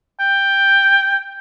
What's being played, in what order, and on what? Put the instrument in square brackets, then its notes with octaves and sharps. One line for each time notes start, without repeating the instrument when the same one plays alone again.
[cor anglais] G5